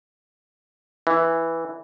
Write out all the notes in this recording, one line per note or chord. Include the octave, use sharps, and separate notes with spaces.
E3